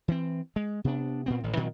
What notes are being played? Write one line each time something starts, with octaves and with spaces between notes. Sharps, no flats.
E3 C4
G#3
C3 B3 D4
A#2 B3 C4
A1 A2 D#3
A#2 D#3 F#3 C4